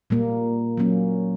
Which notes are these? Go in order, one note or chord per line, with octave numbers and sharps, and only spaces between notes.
A#2 G3 A#3
F#3 A#3 C#4